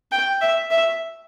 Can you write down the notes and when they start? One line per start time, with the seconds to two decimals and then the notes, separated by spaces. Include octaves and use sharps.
0.12 G5
0.41 E5
0.70 E5